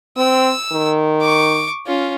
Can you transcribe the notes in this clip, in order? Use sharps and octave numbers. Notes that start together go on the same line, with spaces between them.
C4 E6
D#3
C#6 D6
C#4 F4